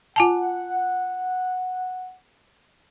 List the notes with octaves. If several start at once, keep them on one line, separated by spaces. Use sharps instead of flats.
F4 F#5 G#5 A5